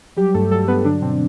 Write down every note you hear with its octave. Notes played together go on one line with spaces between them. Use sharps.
F#3 G3 G4
G2 A3 A4
F#3 A3 A4
G2 B3 B4
D3 F#3 D4
B2 C4